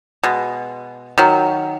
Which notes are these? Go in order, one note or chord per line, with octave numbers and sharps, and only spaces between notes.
B2 G#3
D#3 F#3